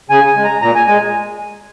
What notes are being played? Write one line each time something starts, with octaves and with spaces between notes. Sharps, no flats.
C#3 G#5
G#5
G#3
A#5
A#2 A#5
G#5
G#3 G#5